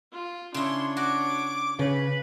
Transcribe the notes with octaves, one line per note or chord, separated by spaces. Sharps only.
F4
C#3 D4 E4 C#5 C6
F#4 D6
C#3 B4